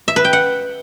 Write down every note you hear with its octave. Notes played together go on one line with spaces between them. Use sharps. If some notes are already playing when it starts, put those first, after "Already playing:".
E5
B4
G5
F#5